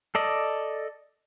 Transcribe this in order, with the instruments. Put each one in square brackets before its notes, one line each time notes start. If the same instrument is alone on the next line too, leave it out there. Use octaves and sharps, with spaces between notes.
[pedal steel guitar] A4 D5 D#5